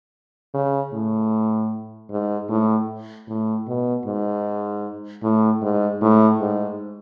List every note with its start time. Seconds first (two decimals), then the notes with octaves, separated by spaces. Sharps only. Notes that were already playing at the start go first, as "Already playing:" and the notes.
0.54 C#3
0.93 A2
2.10 G#2
2.49 A2
3.28 A2
3.67 B2
4.06 G#2
5.23 A2
5.62 G#2
6.01 A2
6.40 G#2